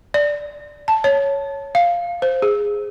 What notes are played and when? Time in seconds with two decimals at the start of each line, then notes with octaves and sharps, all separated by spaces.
0.14 D5
0.88 A5
1.04 C#5
1.75 F5
2.22 C5
2.42 G#4